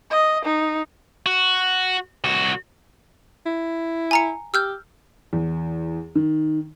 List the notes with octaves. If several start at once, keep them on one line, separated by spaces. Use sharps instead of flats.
D#5
D#4
F#4
C2 F#4
E4
G#5 A#5 C#7
G4 E6 F6 G6
E2
D#3